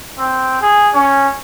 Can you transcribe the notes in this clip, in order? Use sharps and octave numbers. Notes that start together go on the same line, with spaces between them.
C4
G#4
C#4